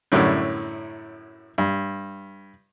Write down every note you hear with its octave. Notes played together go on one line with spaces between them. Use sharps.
F#2 A2 D3 G3 C#4 E4
G2